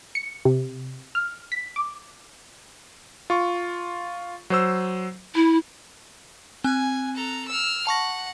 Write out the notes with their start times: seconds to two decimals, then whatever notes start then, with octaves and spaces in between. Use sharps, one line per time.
0.15 C#7
0.45 C3
1.15 F6
1.52 B6
1.76 D6
3.30 F4 C#6
4.50 F#3 C5 E6
5.35 E4 B5
6.64 C4 G#5 F#6
7.16 A4 A#5
7.48 E6 F6
7.87 F#5 A5 C#6 A#6